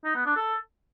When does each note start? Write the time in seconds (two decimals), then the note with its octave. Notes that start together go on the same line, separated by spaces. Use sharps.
0.05 D#4
0.15 B3
0.26 D4
0.37 A4